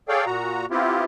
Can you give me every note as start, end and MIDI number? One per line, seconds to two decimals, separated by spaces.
0.09 0.25 68
0.09 0.25 69
0.09 0.25 73
0.09 0.25 74
0.09 0.25 77
0.09 0.25 79
0.26 0.66 46
0.26 0.66 66
0.26 0.66 82
0.71 1.04 59
0.71 1.04 60
0.71 1.04 64
0.71 1.04 65
0.71 1.04 67